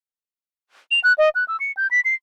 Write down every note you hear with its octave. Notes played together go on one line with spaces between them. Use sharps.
F7
F#6
D#5
F#6
E6
C#7
G6
B6
C7